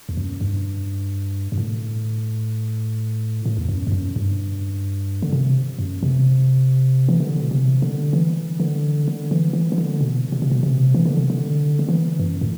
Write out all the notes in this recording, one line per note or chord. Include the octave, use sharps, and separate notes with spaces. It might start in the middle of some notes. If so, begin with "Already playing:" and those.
E2
F#2
G2
G2
A2
A2
E2
F#2
G2
F#2
G2
D3
C3
F#2
C3
E3
D3
B2
C3
D3
E3
D3
D3
E3
E3
E3
D3
B2
B2
C3
B2
C3
E3
D3
C3
D3
D3
E3
F#2
A2